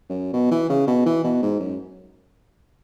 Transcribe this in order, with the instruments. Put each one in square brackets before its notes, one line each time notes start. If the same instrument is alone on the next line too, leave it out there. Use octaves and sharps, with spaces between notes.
[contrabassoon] F#2
B2
E3
C#3
B2
E3
B2
G#2
F#2